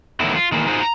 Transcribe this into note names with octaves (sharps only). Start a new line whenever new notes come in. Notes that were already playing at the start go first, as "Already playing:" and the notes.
E2 D3 D#3 F#3 A3 E4
F4
D#3 E3 G#3 A#3
D#4 F4 F#4 G#4 C5
A#5